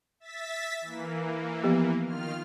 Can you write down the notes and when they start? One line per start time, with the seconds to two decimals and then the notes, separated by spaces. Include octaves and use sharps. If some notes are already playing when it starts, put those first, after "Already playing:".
0.20 E5 A6 B6
0.81 E3 A#3
1.64 F3 B3 G4
2.03 D#3 F4 F6